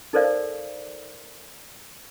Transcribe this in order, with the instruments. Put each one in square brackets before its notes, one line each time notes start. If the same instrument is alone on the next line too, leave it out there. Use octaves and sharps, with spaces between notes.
[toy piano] D#4 A4 A#4 C5 D5 F5